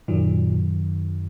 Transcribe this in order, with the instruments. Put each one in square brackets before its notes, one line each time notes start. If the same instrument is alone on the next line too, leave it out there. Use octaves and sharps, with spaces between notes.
[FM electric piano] F#2 D#3 F#3 [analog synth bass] A#2